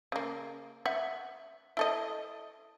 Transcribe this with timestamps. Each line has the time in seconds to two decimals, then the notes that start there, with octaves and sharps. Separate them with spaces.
0.12 C#3 A#3
0.86 E5 F#5
1.77 E4 A4 D#5